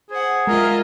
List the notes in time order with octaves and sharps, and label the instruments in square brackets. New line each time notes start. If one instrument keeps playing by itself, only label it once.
[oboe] G#4 [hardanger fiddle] C5 F#5
[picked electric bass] G#3 [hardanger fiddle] F4 D#5 [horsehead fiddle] A#4 E5